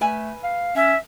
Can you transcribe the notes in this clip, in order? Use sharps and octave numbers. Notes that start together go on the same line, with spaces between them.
A3 B4 E5 G#5
F5
C#4 E5